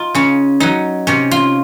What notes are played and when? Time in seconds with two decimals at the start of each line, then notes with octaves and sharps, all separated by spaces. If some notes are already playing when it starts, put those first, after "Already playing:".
Already playing: D#4 F4
0.14 C#3 C#4
0.60 F#3 C#4 D#4
1.07 C3 C#4
1.31 F4